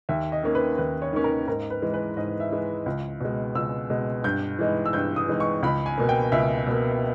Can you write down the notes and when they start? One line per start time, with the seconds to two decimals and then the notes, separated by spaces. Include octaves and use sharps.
0.09 D#2 E5
0.32 D#5
0.43 D#3 A#3 C#4
0.55 B4
0.78 D#2 B4
1.02 C#5
1.13 D#3 A#3 C#4
1.24 A#4
1.47 G#2 A#4
1.70 B4
1.82 E3 G#3
1.94 B4
2.17 G#2 D#5
2.40 E5
2.52 E3 G#3
2.86 C#2
3.20 B2 G#3
3.55 C#2 E6
3.90 B2 G#3
4.24 G2 G6
4.59 E3 G#3 D#4
4.86 E6
4.93 G2 G6
5.16 D#6
5.28 E3 G#3 D#4
5.40 C#6
5.63 C#2 B5
5.86 G#5
5.98 B2 A#3
6.09 G5
6.32 C#2 E5
6.67 B2 A#3